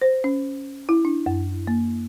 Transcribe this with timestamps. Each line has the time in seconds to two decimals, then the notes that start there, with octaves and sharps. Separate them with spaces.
0.02 C5
0.24 C#4
0.89 E4
1.05 D4
1.26 F#2
1.67 A#3